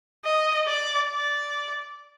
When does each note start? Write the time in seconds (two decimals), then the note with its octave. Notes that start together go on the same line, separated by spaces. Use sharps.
0.25 D#5
0.67 D5
1.10 D5